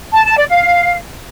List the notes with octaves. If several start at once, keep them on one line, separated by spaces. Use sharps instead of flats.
A5
A5
D5
F5